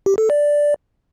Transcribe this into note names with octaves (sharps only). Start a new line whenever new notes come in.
G4
A4
D5